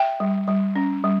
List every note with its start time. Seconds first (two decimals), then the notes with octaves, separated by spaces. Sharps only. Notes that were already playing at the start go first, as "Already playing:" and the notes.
Already playing: E5 G5
0.20 G3
0.48 G3
0.76 C#4
1.04 G3